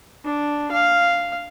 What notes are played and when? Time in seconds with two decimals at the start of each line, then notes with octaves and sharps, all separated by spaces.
0.25 D4
0.72 F5